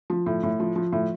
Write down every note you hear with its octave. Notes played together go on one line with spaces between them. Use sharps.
F3
A2
A2
F3
F3
A2